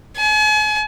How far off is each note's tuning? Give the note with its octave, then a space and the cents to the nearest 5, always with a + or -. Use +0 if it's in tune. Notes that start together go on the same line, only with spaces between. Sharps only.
G#5 +40